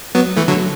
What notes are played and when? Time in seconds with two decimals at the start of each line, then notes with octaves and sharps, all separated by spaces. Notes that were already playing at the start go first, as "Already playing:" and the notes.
0.15 F#3 B3
0.37 E3 A3
0.48 D3 F#3